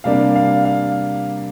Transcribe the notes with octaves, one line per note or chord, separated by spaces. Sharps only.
C3 G3 A#3 D4 F5
F5
F5